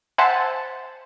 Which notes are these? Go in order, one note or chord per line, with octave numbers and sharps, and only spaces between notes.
C5 E5 F#5 G#5 A5